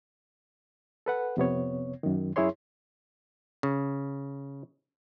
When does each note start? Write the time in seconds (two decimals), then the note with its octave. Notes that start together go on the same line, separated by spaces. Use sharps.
1.06 A4 B4 F#5
1.37 F2 C3 B3 C#5
2.03 F#2 D#3
2.36 F#2 E4 G#4 C#5 C6
3.63 C#3